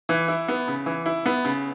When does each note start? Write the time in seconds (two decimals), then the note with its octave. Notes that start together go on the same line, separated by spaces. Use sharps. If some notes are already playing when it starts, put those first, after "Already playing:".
0.09 E3
0.28 E4
0.48 B3
0.68 C#3
0.86 E3
1.06 E4
1.26 B3
1.45 C#3